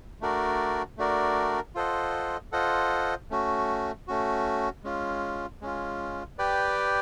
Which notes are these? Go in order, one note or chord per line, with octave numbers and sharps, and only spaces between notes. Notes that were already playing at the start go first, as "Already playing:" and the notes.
A3 D4 F#4 A#4 D5
A3 D4 F#4 A#4 D5
F4 A4 C5 D#5 F#5
F4 A4 C5 D#5 F#5
A3 C#4 F#4
A3 C#4 F#4
G#3 C#4 F4
G#3 C#4 F4
G4 B4 D5 G5